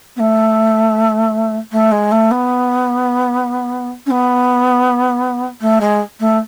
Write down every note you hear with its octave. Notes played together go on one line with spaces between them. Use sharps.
B3
A3
A3
G#3
A3
B3
C#4
B3
A3
G#3
A3